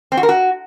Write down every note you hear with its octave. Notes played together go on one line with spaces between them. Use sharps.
C4
F#4
A#4
F#4